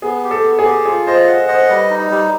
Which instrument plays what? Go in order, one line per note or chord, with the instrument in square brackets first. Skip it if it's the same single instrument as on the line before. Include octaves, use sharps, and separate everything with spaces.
[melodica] B3 [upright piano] G#4
[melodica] G4
[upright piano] A4
[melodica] B3
[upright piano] G#4
[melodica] G4
[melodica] F4 [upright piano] G#4
[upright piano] C5 [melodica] D#5
[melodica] F#5
[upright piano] C5 [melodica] D#5
[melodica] G3 [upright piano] B4
[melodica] D#4
G3